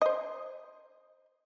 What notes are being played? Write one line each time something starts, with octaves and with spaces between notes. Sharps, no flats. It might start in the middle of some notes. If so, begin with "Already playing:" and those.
C5 D#5